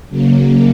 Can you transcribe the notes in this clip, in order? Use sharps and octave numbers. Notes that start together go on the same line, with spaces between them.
C#3 F#3 A#3